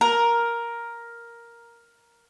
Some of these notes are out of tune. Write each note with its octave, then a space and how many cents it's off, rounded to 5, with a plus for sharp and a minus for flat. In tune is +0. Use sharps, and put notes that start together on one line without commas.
A#4 +5